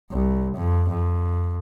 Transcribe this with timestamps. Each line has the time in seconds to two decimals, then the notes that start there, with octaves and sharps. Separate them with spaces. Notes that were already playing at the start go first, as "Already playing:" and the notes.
0.11 C2
0.55 F2
0.89 F2